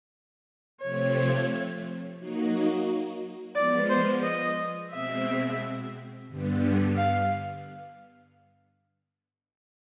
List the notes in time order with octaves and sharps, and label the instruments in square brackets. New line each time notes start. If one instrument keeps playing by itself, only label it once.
[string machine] C3 F3 A3 C4 [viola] C#5
[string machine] F#3 A#3 D#4 F#4
[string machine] F3 G#3 B3 [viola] D5
[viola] C5
D#5
[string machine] B2 G#3 C4 [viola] E5
[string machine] G2 D3 G3 B3
[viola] F5